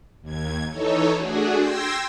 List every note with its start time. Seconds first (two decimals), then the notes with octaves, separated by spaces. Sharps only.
0.21 D#2 G#6
0.69 E3 D#4 A4 C#5
1.15 A3 D4 F#4 G#4
1.56 G5 C6 E6 G6 G#6 A#6